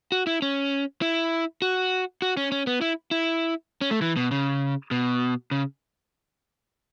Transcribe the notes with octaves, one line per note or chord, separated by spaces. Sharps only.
F#4
E4
C#4
E4
F#4
F#4
C#4
C#4
B3
E4
E4
C#4
A3
E3
B2
C#3
B2
C#3